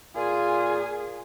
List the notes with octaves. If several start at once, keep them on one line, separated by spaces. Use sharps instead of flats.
A#2 F4 G#4 G#5